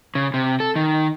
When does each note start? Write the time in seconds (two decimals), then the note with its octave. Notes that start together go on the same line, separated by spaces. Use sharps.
0.15 C#3
0.34 C3
0.60 A4
0.76 D#3